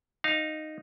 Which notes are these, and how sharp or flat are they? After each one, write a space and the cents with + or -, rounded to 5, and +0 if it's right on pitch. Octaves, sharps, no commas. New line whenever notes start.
D#4 -10 F5 +0